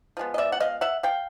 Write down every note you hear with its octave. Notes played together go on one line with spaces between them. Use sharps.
F3 G#3 B3
D#5
D5 E5
F#5
D#5 F5
E5 F#5
F5 G5